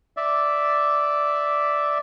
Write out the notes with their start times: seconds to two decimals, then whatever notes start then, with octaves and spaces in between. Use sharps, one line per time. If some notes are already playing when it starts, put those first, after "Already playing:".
0.17 D5 E5